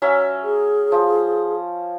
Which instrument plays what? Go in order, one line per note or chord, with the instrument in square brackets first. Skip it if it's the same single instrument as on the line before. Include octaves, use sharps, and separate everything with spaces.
[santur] F#3 C#4 E5
[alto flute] G#4
[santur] F3